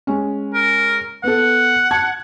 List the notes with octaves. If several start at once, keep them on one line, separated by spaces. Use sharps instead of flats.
G#3 C#4
A#4
B3 A4 F#5
A5 G#6